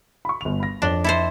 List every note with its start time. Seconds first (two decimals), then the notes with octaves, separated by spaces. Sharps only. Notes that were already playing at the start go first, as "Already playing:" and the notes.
0.25 B5 C#6
0.41 G1 F7
0.60 B5 A#6
0.82 F2 D4 C#5 G7
1.04 E4 A4 C5